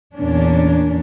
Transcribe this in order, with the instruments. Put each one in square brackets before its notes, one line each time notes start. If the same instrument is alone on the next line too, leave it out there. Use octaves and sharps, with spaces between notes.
[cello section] E2 A#2 A#3 C#4 D4